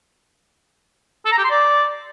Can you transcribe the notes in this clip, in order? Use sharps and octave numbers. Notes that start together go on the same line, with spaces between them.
A4
A#5
G4
C6
D5